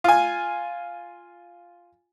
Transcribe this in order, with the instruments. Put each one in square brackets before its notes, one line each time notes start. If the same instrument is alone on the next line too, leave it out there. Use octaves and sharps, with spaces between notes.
[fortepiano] F4 G#5